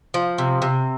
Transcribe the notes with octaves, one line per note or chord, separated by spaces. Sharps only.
F3
C3
C3